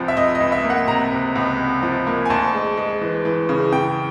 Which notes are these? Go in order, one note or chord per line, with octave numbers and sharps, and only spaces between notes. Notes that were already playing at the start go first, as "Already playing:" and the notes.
Already playing: C#2 C3 F3
E5
C3 D#5
D#5
C#2
E5
A#3
F#5
C3 A#5
C3
C#2
C3
F3
A#3
G#5
D2 A5
G#3
G#3
E3
E3
C#3
C#3 G5